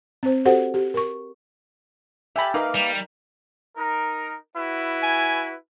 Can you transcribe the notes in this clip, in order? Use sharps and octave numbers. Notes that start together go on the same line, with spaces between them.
C4 C5
F#4 G4 A4 C5 F#5
G4
A#4 C#6
G4 E5 G#5 A5 B5
A#3 D#4 A#4 B4 F5
G3
D#4 A#4
E4 F#4 B4
G#5